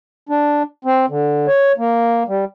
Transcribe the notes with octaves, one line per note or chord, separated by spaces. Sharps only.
D4
C4
D3
C#5
A#3
G3